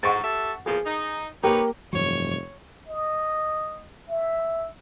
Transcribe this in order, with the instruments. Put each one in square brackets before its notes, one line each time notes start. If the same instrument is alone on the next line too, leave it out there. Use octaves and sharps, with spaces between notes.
[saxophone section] G#2 [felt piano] F#5 C#6 A6
[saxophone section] G4 A4 E5
[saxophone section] E2 A#2 F3 [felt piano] G#4
[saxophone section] D#4
[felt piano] A#3 G4 [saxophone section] D#4 B4 C#5
[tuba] F1 [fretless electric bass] G2 E3 F#3 [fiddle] C#5
[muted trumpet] D#5
E5